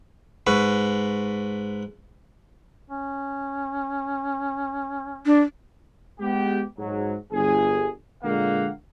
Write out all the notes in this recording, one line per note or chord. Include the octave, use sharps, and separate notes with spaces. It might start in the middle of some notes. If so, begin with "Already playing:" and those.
G#2 B4 C#6
C#4
D4
G#3 B3 G4
G#2 F#3
G1 G#4
A#2 D3 G#3 A#3 F5 F#5